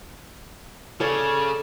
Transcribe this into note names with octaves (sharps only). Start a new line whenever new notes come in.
C#3 A4 C#5 D5